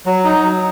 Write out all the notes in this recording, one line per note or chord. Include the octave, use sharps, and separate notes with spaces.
F#3
D#4
F#3